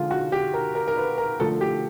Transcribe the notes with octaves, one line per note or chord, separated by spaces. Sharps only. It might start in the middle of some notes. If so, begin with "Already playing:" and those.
Already playing: D3 F3 G#3 F4
F#4
G4
A#4
A#4
A#4
B4
A#4
D3 F3 A3 A4
G4